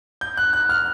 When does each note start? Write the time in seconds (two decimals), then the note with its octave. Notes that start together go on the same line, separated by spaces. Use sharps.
0.21 G6
0.37 F#6
0.53 F#6
0.69 F6